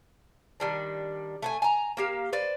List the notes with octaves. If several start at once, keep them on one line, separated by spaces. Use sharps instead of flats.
D#3 G3 D4
A3 F#5 G#5
G#5 A#5
A#3 G4 F5
B4 C5 D5